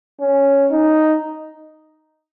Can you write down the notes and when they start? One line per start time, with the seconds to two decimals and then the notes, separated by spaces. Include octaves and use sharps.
0.21 C#4
0.71 D#4